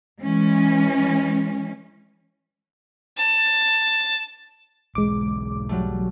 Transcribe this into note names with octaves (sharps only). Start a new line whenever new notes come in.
E3 G#3 C#4
A5
B1 E2 G#2 G#3 D6
F#3 G3 A3